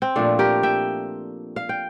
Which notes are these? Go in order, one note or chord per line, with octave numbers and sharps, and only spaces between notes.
C4
A#2 F3 A3 D4
G4 A#4
E5 G5
F5
G5